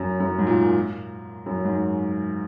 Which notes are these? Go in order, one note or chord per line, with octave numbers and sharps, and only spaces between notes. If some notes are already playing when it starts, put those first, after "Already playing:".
Already playing: F#2
F#2
G#2
A#2
F#2
G#2